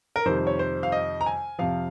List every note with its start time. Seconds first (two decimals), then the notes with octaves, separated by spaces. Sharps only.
0.16 A#4
0.25 F2 C3 D#3 G3 C5
0.47 C#5
0.59 C5
0.83 F5
0.92 D#5
1.21 A#5
1.26 G#5
1.59 F2 C3 F3 F5